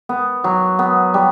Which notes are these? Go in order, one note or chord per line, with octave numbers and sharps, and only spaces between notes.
B3
F#3
B3
G3